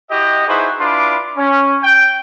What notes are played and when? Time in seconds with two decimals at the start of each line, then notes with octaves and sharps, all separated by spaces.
0.10 E4 F#4 G4 D#5
0.47 D#4 E4 F#4 G#4 B4 C5
0.80 D4 E4 F4 B4 C6 D6
1.38 C#4
1.82 G5